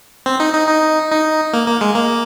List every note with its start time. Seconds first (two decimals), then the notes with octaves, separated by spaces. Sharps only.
0.26 C4
0.40 D#4
0.54 D#4
0.69 D#4
1.11 D#4
1.53 A#3
1.67 A#3
1.81 G#3
1.95 A#3